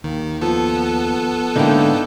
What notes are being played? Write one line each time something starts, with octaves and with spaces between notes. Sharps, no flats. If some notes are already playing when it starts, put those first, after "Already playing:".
D#2 D#3
F3 B3 A4
G#2 D3 A#3 D#4 E4 G5